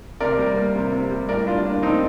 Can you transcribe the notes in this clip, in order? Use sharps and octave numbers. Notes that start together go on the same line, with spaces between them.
C3 A#4 D5
G3
A#3
C3
C3
G3
A2 A#4 D5
G3 D4 F4
A#3 D4
A2 C4 D#4